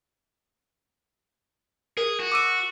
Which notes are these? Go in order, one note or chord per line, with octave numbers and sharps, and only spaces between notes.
G#4 A#4
F#4
D6 E6 D#7